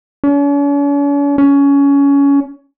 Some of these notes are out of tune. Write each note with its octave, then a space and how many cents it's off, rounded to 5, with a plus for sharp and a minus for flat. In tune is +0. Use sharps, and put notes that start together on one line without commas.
C#4 +45
C#4 +20